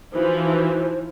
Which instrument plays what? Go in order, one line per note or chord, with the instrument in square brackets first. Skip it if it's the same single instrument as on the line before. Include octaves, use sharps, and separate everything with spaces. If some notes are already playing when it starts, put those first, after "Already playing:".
[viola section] E3 F3 [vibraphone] D#4 E4 F#4 [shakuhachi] C5